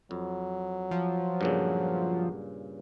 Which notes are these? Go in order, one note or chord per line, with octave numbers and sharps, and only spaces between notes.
F2 F#3
F3
G2 A#2 C#3